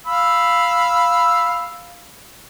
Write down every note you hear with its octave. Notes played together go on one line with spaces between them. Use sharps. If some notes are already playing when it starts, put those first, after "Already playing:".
F5 B5 E6